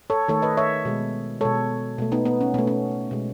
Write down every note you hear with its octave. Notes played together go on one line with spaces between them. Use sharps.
A4 C#5
D#3 A3 A4 C#5
B4 D#5
C#5 E5
B2 G#3
B2 G#3 A4 C#5
B2 A3
B3 D#4
B3
C#4
B2 A3 B3
C#4
B2 G#3